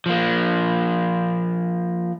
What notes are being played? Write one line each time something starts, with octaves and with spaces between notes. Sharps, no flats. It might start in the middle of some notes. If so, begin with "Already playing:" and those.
F3 A#3